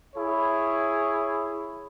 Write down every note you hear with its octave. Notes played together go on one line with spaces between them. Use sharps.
E4 G#4 C#5